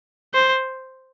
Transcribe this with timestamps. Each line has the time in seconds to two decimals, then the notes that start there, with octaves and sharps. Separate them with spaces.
0.34 C5